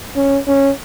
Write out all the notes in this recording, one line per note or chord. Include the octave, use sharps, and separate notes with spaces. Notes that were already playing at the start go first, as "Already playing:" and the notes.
C#4
C#4